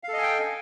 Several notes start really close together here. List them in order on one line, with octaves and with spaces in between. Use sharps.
F5 A4 D#5 G#5 G5